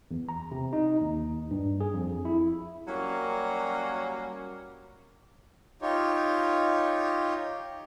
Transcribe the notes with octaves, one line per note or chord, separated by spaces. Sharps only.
E2
A#5
C3
D#4
D#2
G2
G#4
F2
E4
F#3 G3 A#3 C#4
D#4 F4 G4 C#5